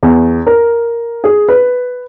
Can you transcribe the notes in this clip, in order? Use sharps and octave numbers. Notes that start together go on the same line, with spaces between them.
E2
A#4
G#4
B4